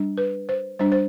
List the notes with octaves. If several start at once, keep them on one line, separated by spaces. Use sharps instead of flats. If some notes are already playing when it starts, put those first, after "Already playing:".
Already playing: G3 D4
B4
C5
G3 D4 C5
C5